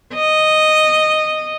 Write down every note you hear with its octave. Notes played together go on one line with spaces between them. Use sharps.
D#5